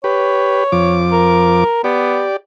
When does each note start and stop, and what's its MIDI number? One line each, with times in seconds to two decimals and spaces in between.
0.04 0.64 67
0.04 0.64 71
0.04 0.99 73
0.72 1.64 41
0.72 1.64 53
0.72 1.64 86
1.12 1.80 70
1.84 2.25 59
1.84 2.37 67
1.84 2.37 74